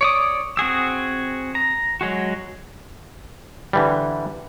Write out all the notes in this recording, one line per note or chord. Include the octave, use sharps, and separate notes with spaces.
C#5 D5 D#6
C4 F#4 G#4 E6
A#5
F#3 G#3 F#4
D3 E3 G3